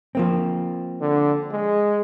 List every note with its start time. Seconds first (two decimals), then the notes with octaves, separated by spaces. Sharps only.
0.15 F3 A#3 C4
1.01 D3
1.52 G#3